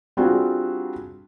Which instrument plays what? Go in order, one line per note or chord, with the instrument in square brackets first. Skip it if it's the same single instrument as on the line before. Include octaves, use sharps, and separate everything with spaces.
[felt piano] G3 C4 D4 F4 F#4 G#4